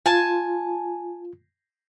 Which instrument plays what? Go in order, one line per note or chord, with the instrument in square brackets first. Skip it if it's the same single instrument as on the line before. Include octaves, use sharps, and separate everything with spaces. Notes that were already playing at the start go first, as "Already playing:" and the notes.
[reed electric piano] F4 [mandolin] G#5 A5